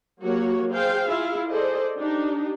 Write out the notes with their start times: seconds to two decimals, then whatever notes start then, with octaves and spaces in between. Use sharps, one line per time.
0.21 F#3 A#3 F#4 G4 C#5
0.70 G#4 C5 F5 G5
1.08 E4 F4 G#4 E5 F5
1.49 G#4 A4 C5 D5 D#5
1.98 D4 D#4 G4